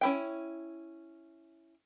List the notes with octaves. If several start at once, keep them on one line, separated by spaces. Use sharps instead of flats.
C#4 E4 G5